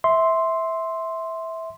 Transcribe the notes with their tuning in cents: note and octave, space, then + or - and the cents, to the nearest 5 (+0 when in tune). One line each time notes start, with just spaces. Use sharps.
E5 -15 C6 +0